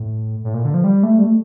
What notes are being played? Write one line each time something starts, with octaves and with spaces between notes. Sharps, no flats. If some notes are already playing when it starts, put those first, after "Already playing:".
Already playing: A2
A2
A#2
D3
F3
G3
A3
G3
A3